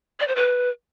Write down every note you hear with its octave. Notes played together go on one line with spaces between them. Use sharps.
D5
C5
B4